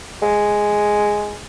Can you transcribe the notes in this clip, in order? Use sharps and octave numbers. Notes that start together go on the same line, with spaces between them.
G#3